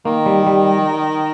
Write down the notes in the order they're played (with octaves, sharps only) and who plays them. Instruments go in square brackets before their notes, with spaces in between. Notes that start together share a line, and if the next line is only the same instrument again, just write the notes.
[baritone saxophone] D#3 [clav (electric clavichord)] A#3
[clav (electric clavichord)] G3
G3